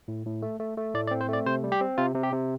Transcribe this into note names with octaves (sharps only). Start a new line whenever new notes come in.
A2
A2
A3
A3
A3
A2 D5
D5
C4
C5
A3 D5
C3 C5
G3
G4
C4
C3 F4
C3
G4
C3